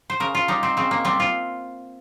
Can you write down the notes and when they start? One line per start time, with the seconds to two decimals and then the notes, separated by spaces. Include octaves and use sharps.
0.10 C5
0.20 C#3 A#4
0.35 F4
0.48 G3 D#4
0.63 C4
0.77 C#3 C4
0.91 A#3
1.05 G3 C4
1.20 F4